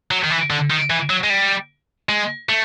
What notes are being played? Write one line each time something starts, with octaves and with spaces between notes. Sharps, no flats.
F#3
D#3
E3
D3
D#3
E3
F#3
G#3
G3
G#3
A3